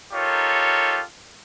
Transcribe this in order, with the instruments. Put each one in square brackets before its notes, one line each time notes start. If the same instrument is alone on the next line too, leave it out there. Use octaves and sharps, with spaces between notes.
[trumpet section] D#4 F4 G4 A4 A#4 C#5